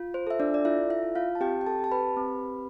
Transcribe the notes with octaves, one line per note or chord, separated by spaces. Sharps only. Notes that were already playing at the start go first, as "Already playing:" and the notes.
Already playing: F4
C5
A4 E5
D4 D5
D5
E4 F4 E5
E4 E5
F4
F4 F5
A5
C4 G4 G5
G5
A4 A5
G4 A5
B4 B5
C4